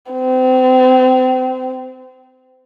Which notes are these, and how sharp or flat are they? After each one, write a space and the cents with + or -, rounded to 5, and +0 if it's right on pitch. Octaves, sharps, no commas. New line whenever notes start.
C4 -30